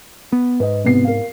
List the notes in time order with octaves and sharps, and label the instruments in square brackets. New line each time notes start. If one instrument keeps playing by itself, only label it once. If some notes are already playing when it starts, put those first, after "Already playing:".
[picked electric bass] B3
[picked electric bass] G#2 [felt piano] B4 D#5
[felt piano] C2 B3 C7
A#4 F5